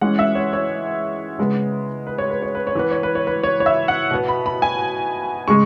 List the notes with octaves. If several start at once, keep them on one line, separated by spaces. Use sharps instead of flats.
E3 G#3 C#4 F#5
E5
C#5
C#5
C#3 G#3 B3
B4
C#5
B4
C#5
B4
C#5
E3 B3 B4
C#5
B4
C#5
B4
C#5
C#5
E5
F#5
B2 B3
B5
B5
G#5
C#3 G#3 C#6